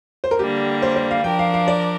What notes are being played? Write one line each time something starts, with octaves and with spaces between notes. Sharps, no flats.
C5
A#4
D3 G3 A#3 G4
C5
C5
F5
F3 D4 A#4 G5
F5
F5
D5